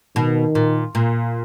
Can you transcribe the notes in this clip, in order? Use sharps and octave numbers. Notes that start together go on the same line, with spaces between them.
B2 D#3
A#2
A#2